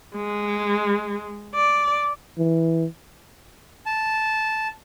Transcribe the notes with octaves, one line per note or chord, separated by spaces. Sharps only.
G#3
D5
E3
A5